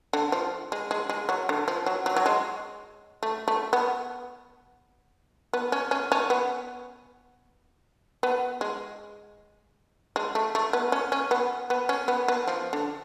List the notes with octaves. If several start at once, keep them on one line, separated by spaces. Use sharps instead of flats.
D3
F3
G#3
G#3
G#3
F#3
D3
F3
F#3
F#3
F#3
G#3
A3
A3
B3
B3
C#4
C#4
C#4
B3
B3
G#3
G#3
A3
A3
B3
C#4
C#4
B3
B3
C#4
B3
B3
F3
D3